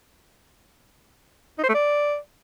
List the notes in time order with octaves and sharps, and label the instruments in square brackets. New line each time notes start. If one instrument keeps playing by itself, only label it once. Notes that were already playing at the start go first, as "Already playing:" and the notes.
[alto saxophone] D#4
C5
A3
D5